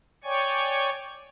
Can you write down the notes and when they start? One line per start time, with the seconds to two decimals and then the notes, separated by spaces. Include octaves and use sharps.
0.24 C#5 D5 G5 G#5 C#6